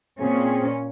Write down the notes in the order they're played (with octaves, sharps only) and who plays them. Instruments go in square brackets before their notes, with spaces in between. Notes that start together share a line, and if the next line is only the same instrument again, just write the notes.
[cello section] A#2 C#4 [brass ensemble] C4 G#4